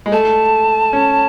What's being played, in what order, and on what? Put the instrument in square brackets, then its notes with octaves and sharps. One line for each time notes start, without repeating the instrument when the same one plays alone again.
[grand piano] G#3
[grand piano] A3 [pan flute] A5
[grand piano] C#4